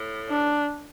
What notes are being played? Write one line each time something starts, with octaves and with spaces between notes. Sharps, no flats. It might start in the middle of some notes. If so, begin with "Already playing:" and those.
Already playing: A2
D4